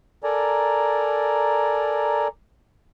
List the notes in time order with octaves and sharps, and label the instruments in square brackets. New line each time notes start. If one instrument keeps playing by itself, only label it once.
[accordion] A4 A#4 D5 G#5 A#5